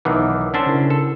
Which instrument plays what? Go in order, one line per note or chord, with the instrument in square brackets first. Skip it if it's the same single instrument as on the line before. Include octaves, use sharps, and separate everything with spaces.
[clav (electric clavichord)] B1 D#3 E3 [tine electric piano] B4 F#5 D6
[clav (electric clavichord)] C#4 D4 C5 [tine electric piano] F#5 E6
[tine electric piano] C#3 E4 A#4
[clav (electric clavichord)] A4